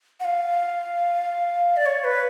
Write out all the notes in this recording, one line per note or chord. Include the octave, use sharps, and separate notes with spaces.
F#5
F5
D5
C#5
B4